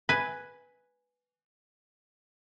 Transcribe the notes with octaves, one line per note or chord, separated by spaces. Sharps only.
B4 G#5